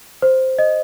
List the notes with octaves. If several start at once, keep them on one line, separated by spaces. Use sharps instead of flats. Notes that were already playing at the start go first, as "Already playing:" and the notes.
C5
D#5